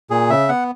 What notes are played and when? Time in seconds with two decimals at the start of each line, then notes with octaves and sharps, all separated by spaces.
0.10 A#2 G#4
0.30 C#3 E5
0.49 B3 F#5